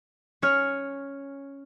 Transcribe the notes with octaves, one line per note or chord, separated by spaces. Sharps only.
C#4 C#5 F6